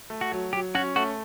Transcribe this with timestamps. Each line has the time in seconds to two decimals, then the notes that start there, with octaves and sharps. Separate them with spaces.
0.10 A3
0.21 F#4
0.32 F#3
0.53 F#3 G4
0.75 C#4 F#4
0.96 A3 F#4